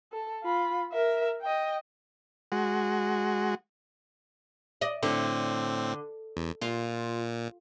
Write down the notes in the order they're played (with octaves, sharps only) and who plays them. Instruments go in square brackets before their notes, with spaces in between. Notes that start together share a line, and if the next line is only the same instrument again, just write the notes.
[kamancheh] A4
F4 B5
A#4 E5
D#5 G5
[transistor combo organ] G#3 F#4
[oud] D5 D#5
[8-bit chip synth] A2 C4 [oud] D3
[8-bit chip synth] E2
[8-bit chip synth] A#2 [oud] F4